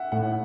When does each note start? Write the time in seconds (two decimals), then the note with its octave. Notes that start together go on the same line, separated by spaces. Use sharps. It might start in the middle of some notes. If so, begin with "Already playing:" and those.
Already playing: E5 F#5
0.12 A2 F#5